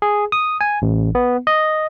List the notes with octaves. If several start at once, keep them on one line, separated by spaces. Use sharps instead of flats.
G#4
D#6
G#5
A1
B3
D#5